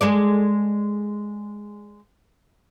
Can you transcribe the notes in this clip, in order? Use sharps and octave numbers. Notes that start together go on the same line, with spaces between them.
G#3 A4 D5